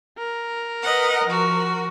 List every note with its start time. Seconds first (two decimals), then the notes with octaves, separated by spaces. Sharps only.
0.18 A#4
0.84 B4 D#5 F#5
1.25 F3 F#4